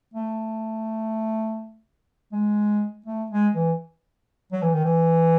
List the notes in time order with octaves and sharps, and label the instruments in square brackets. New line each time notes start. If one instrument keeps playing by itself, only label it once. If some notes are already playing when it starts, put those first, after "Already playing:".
[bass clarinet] A3
G#3
A3
G#3
E3
F#3
E3
D#3
E3